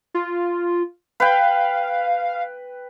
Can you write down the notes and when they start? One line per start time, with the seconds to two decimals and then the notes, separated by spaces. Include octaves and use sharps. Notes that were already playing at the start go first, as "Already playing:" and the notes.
0.14 F4
1.20 B4 F5 G5